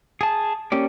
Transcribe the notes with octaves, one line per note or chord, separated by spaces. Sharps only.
G#4 A5
A#3 C#4 G4 D5